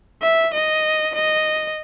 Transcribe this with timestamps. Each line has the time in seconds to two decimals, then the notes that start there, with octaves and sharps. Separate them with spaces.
0.22 E5
0.54 D#5
1.15 D#5